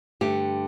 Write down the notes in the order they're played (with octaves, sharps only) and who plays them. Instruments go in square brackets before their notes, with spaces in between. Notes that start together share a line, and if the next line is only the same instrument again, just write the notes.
[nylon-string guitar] G2 D3 A3 G4